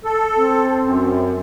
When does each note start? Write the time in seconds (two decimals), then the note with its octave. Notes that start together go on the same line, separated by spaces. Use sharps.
0.05 A4
0.36 C4
0.83 F#2